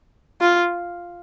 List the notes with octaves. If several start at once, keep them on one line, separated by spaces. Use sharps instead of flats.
F4